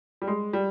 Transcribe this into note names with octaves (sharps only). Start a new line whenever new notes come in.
G3
G#3
G3